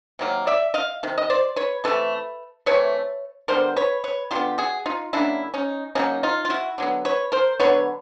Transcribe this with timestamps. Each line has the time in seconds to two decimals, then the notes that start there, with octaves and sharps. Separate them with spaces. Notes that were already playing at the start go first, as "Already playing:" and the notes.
0.19 C3 D#3 F#3 A#3
0.47 D5 E5
0.74 D#5 F5
1.03 C3 D#3
1.18 D#5
1.30 C5 D5
1.56 B4 C#5
1.84 C3 E3 A3 A4 B4
2.66 C3 E3 A3 B4 C#5
3.48 D3 G3 B3 A#4 C5
3.76 B4 C#5
4.04 B4 C#5
4.31 D3 G3 B3 F4 G4
4.58 F#4 G#4
4.86 D#4 F4
5.13 C#3 F#3 A#3 D4 E4
5.54 C#4 D#4
5.95 C#3 F#3 A#3 C#4 D#4
6.23 D#4 F4
6.45 F4
6.50 E4 F#4
6.78 D3 F#3 B3
7.05 B4 C#5
7.32 A#4 C5
7.60 D3 F#3 B3 B4 C#5